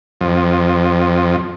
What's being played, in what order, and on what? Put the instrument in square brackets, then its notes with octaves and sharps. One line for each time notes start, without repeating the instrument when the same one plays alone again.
[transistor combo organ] F2